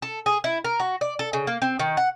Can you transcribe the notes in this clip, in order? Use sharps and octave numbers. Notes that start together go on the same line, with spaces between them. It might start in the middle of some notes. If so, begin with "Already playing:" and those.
A4
G#4
E4
A#4
F#4
D5
A4
C#3
A#3
C4
D#3
F#5